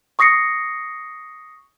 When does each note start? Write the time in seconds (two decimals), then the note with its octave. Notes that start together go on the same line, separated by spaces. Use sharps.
0.19 C#6 D#6 A#6 C7 C#7